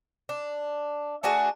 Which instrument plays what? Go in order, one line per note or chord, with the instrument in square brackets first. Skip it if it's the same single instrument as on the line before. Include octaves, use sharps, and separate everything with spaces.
[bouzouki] D4
A3 D4 F#4 G#4